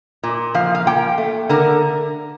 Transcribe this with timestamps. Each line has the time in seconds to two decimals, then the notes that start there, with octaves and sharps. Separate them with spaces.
0.24 A#2
0.54 F3 F5
0.75 F5
0.87 A#3 G5
1.18 A3
1.49 D3 A#4